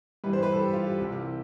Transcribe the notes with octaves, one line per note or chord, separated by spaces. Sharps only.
G2 E3 G3 B4
C5
B4
A4
G4
F4
G4
C2 C3 E3